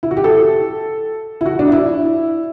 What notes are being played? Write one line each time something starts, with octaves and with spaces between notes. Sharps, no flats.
E4
F#4
G4
A4
E4
F#4
D4
E4